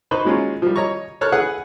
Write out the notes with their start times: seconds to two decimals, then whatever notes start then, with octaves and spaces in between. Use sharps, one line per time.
0.11 D#4 B4 C5 B5 C#6
0.25 F#3 G#3 C#4 F4
0.62 F3 G3
0.76 C#5 D#5 A#5 C#6
1.21 A4 C#5 F6 F#6
1.32 G#4 B4 F#5